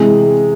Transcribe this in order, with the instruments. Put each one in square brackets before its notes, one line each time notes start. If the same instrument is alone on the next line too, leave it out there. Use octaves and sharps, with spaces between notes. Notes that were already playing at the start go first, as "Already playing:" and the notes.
Already playing: [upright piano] C3 E3 G#3